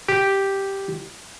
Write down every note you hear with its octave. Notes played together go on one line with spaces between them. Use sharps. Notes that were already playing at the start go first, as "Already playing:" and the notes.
G4